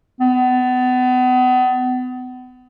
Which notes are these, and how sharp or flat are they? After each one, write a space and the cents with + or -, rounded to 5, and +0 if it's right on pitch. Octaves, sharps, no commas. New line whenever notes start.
B3 +35